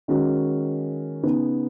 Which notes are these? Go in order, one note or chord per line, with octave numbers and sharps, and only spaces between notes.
D#3 G#3 C#4 F#4
C#3 B3 D#4